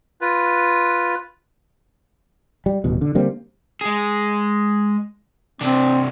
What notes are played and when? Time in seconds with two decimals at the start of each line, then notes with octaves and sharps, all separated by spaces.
0.21 F4 B4
2.66 G3
2.84 D#1 A1 B2
3.01 D3
3.15 D3 G3 A#3 C4
3.81 G#3 G#4
5.61 C3 C4 D4